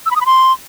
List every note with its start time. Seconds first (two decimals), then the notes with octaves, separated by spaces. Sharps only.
0.06 E6
0.11 B5
0.16 D#6
0.21 B5
0.26 C6